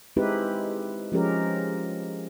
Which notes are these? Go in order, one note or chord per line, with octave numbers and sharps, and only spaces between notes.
G#3 C4 D#4 E4 G4 B4
F3 G#3 C#4 G4 A#4